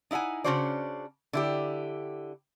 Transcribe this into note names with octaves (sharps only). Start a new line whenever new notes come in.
D#4 E4 E5 F#5 G#5
C#3 C#4 D4 F#4 C5 D5
D3 E4 G4